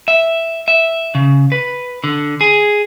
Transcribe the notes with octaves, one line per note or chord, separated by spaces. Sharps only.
E5
E5
C#3
B4
D3
G#4